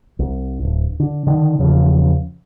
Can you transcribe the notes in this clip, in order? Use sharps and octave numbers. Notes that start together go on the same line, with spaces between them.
C2
D1
D3
D3 D#3
E2 C#3 F3